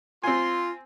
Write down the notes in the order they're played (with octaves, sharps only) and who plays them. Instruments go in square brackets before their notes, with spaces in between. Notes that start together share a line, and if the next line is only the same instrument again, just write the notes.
[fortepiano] C4 G#5 [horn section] F4 [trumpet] C6